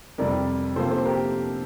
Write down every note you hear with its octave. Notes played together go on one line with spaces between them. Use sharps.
F2 C3 G3 A#4 D5
C3 F3 A#3 F4 A4 C5
A4 C5
G4 A#4